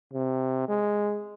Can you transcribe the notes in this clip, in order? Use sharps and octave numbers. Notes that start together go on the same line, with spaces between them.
C3
G#3